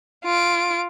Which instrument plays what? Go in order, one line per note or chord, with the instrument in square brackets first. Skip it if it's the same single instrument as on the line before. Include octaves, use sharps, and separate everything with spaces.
[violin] F4 D7